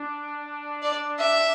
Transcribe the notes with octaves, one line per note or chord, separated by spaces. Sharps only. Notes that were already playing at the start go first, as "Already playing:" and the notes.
Already playing: D4
D5
E5